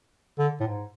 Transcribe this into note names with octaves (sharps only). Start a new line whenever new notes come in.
D3
A2
G#2